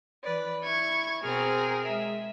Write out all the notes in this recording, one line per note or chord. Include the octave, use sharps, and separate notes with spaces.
E3 B4 D5
E4 C#6 G#6
B2 C4 G#4 A#4 F6
G#3 E5